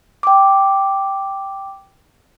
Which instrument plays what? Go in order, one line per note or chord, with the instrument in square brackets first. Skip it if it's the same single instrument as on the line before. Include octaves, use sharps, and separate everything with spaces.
[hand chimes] G5 D6